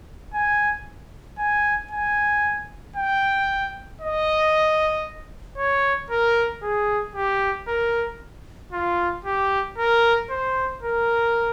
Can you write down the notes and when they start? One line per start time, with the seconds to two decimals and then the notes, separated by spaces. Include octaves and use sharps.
0.34 G#5
1.38 G#5
1.91 G#5
2.96 G5
4.01 D#5
5.57 C#5
6.10 A#4
6.63 G#4
7.15 G4
7.68 A#4
8.72 F4
9.25 G4
9.78 A#4
10.30 C5
10.83 A#4